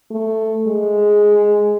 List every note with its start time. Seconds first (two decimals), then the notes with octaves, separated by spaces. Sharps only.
0.11 A3
0.67 G#3